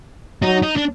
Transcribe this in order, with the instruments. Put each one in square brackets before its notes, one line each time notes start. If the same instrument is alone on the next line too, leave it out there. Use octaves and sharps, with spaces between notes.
[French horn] F#3 [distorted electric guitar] D#4
[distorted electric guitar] D#4
D4